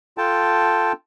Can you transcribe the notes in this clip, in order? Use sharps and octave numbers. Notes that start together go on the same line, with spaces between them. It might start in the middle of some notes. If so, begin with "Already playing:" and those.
F4 A4 G5 A5